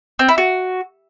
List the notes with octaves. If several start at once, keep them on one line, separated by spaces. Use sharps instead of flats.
C4
E4
F#4